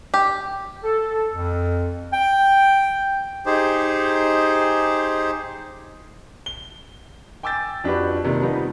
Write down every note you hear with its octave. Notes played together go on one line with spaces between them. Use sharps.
G4
A4
F2
G5
D#4 G4 G#4 C5
G7
G5 G#5 D6 E6 G6 A6
F2 D4 F#4 G4 B4
D#2 C3 D#3
F3 G3 B3 D#4